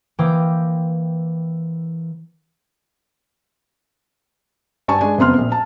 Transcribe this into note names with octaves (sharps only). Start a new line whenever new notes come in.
E3 A#3 C5 G5 D6 D#6
G2 G#5 A5 C#6
G#3 D4 G#5
F#1 F2 B3 C6 F6
A#1
A5